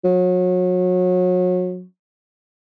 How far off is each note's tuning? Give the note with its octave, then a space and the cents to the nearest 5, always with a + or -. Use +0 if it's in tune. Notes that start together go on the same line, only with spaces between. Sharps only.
F#3 -30